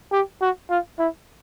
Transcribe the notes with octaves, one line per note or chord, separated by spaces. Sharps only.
G4
F#4
F4
E4